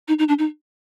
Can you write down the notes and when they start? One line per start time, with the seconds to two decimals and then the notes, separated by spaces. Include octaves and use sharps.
0.08 D#4
0.19 D#4
0.28 D4
0.39 D#4